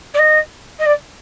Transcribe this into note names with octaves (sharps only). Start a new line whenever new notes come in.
D5
D#5
D#5
D5